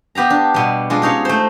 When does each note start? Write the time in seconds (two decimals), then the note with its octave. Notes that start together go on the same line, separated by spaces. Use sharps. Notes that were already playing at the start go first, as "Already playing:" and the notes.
0.15 B3 G4 F5 A#5
0.30 D4
0.54 B2 G3
0.90 G#3 D4 F4
1.02 C#4 D#4 C#5 F5
1.25 A3 C5